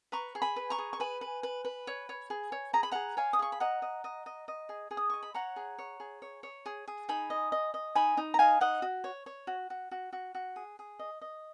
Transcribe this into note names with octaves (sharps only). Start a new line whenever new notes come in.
B4 A#5 C#6
G#4
G#5 B5
B4
A#5 C#6
G#4
C#6
B4 G#5 B5
B4
B4
B4
C#5
C#5
G#4
C#5
G#4 A#5
B5
G#4 F#5 A#5
C#5 F5 G#5
D#6
G#4 C#6
B5
D#5 F#5 A#5
D#5
D#5
D#5
D#5
G#4
G#4
D#6
D#5 C#6
B5
C#5 F#5 A#5
G#4
C#5
G#4
C#5
C#5
G#4
G#4
D#4 G#5 B5
D#5
D#5
D#5
D#4 G#5 B5
D#4
A#5
D#5 F5 G#5
D#4 D#5 F#5
F#4
C#5
C#5
F#4
F#4
F#4
F#4
F#4
G#4
G#4
D#5
D#5